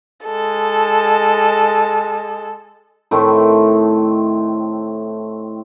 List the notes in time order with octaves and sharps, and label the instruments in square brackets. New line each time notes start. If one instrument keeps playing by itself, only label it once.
[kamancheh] G#3 A4
[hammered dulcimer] A2 D#3 A3 C4